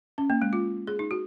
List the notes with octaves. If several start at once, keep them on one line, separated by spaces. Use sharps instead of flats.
C#4
A#3
G#3
F4
G#4
D#4
F#4